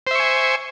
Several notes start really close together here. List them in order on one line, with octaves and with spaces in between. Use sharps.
C5 E5 C#6 G#5